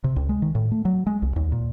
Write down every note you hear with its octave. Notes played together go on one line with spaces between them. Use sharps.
C3
C#2
G#3
D#3
A2
A3
F#3
G#3
C2
D#2
A#2